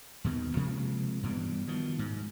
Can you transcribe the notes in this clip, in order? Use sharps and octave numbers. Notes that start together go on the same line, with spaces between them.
D#2 B2 D#3
C3 F3 G#3 A#3
G2 B2 E3 G3
B2 D#3 F3
G#2